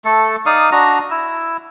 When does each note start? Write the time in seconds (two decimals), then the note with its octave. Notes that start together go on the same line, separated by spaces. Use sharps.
0.05 A3 A4
0.46 D#4 D5 F5 D#6
0.72 D4 F#4 A#5
1.11 E4 E6